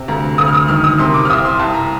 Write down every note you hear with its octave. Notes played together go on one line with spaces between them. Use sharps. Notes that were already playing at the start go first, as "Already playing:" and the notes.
Already playing: C3
D2 A#5
D2 D#6
F6
D#6
D#3 F6
D#6
C3 C6
D6
F6
C2 D#6
C6
C2 A5
A#5